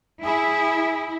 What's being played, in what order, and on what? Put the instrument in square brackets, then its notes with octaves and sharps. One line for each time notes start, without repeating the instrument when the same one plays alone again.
[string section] E4 [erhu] G#4